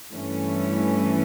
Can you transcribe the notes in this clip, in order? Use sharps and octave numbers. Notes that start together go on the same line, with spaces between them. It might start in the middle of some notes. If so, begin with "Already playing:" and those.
G2 E3 A3 C#4